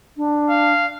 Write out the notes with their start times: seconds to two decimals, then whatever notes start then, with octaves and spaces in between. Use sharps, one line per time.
0.17 D4
0.50 F5